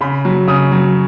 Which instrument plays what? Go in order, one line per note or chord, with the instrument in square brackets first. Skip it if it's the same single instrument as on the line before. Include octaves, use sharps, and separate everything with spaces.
[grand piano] C#3 B5
F#3
C#3 D#6
F#3